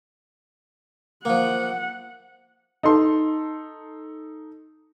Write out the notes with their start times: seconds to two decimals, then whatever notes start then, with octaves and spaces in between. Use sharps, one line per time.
1.25 F3 A#3 F#5
2.83 D#4 A4 C6